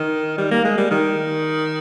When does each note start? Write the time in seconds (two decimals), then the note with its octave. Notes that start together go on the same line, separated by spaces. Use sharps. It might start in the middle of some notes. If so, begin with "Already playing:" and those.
Already playing: D#3
0.38 G3
0.51 A#3
0.64 G#3
0.77 G3
0.91 D#3